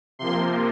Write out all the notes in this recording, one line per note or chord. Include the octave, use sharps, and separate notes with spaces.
C3 F3 A#3 C6